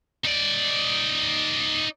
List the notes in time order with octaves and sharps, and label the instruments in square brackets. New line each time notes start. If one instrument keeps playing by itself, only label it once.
[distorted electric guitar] D#4 D5